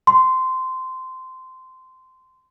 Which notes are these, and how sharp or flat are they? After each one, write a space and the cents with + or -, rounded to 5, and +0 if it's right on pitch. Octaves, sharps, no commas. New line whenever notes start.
C6 -15